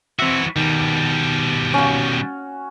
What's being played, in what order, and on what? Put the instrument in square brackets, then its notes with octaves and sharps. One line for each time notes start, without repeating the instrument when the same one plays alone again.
[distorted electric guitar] E3 F#4 [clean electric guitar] C4 E5
[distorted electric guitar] B2 G3 [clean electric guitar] D#3
[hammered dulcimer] C#4 F#4